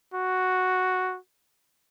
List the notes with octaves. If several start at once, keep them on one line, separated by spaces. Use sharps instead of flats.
F#4